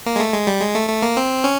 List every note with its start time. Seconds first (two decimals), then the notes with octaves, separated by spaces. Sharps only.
0.06 A#3
0.16 G#3
0.20 A3
0.34 G#3
0.47 G3
0.61 G#3
0.75 A3
0.89 A3
1.03 A#3
1.17 C4
1.44 C#4